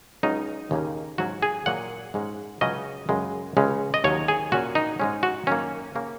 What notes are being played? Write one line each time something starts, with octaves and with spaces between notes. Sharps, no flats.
C#2 C#3 F#3 C#4 D#4
D#2 C#3 A#3 C#4
G#2 F#3 C#4 F#4
G#4
A#2 F#3 A#3 F#5
G#2 G#3 C#4
C#2 C#3 F#3 C#4 D#5
F#2 C#3 G#3
C#2 C#3 G#3 C#4
D#5
D#2 D#3 F#3 C#5
G#4
A#2 A#3 C#4 F#4
D#4
G#2 G#3 C#4
F#4
F#2 D#3 A#3 C#4
C#3 A#3 C#4